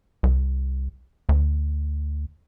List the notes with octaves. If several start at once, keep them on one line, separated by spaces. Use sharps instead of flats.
C2
D2